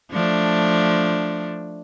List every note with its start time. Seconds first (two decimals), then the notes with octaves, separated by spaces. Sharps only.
0.12 F3 A3 D4